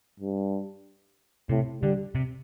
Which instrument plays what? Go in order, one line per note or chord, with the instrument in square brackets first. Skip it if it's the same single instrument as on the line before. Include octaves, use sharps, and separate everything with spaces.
[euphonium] G2
[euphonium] A2 [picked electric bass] C3
[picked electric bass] D3 [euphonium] G3
[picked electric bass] C3